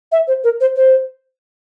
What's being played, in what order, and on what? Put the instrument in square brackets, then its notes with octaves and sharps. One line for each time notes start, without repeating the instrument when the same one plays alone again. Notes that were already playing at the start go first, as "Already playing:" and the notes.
[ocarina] E5
C5
A#4
C5
C5